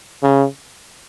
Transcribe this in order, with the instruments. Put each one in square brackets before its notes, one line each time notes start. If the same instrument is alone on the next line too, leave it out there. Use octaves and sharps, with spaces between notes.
[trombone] C#3